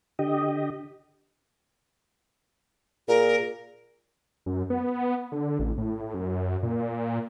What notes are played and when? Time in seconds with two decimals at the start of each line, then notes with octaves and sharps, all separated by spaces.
0.19 D3 G4 D#5
3.08 A#2 G#4 A#4
4.46 F#2
4.70 B3
5.32 D3
5.59 A1
5.78 A2
6.14 F#2
6.63 A#2